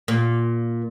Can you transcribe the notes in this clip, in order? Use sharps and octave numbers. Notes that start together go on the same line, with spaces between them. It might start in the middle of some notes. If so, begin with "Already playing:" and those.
A#2